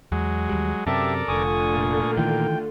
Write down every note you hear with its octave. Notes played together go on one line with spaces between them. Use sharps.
E2 F#3 G#3
D#2 G3
F#2 C3 G4 A4 A#4 D5 E5 A5
F1 D3 A3 F4 G#5 C#6 D#6
A#2
D#3 E3 G5